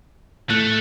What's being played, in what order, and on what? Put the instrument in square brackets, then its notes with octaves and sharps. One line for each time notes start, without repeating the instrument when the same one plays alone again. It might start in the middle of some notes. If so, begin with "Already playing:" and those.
[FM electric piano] A2 [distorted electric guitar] A3 [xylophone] F#6 C#7